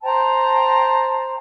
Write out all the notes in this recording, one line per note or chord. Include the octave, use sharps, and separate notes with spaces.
C5 G5 A5 A#5